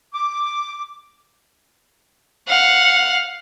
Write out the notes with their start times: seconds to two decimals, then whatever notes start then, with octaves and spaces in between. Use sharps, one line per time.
0.14 D6
2.48 F5 F#5